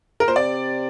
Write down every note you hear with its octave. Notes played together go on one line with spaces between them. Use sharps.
A#4
A#2 C5
C3 D5